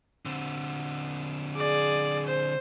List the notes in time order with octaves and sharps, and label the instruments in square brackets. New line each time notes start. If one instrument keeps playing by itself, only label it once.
[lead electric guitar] D3 C4
[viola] G#4 D5
C5